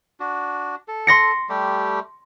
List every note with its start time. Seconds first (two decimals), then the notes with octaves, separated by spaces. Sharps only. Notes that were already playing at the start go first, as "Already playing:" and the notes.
0.20 D4 F#4
0.88 A4
1.07 C6 A#6 C#7
1.49 G3 A3 G4